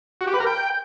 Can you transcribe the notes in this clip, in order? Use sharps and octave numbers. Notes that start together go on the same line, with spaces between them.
F#4
G4
B4
A#4
G5